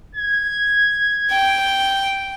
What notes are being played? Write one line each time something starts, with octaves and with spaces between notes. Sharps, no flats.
G#6
G5